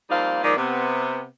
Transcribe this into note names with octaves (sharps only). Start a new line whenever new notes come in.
F3 G3 A#3 C4 D#4 F5
G#2 D#3 F3 A#3 D#4 D5
C3 B3